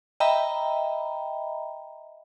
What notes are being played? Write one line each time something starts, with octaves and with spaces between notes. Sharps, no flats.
D#5 E5 G5 A#5 B5